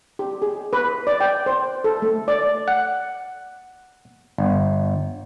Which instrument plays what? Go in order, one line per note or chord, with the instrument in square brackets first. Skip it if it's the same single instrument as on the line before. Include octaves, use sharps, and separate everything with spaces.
[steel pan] G4
G#4
B4
D5
G5
C5
A4
A3
D5
[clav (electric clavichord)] F#5
G1